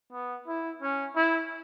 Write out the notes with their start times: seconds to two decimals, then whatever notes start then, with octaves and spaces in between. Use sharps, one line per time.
0.13 B3
0.48 E4
0.82 C#4
1.16 E4